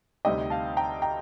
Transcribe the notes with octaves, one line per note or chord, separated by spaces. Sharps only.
D2 C3 G3 C4 D#4 D#5 G5
F5 A5
G5 A#5
G5 A#5